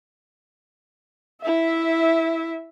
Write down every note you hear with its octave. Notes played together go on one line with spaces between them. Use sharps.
E4 E5